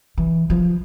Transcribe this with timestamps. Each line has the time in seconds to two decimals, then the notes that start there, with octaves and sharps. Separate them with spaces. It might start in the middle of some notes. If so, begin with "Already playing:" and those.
0.18 E3
0.50 F3